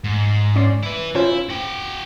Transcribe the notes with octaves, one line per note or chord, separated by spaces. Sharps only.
G#2
C#4 D5 C6
E4 B4
C#4 E4 F4 C5
F#4 G5